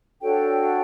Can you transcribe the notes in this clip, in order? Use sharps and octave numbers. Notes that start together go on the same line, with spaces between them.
D4 F#4 A4 C#5 G5